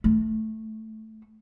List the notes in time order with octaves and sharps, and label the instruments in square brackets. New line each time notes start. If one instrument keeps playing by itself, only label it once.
[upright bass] A3